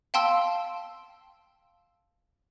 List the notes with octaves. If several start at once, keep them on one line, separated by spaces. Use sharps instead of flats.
F5 G5 A5 C6 E6